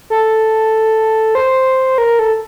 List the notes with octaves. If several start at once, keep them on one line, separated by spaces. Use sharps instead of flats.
A4
C5
A#4
A4